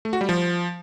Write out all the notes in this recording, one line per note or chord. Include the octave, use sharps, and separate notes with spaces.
A3
F#4
G3
F3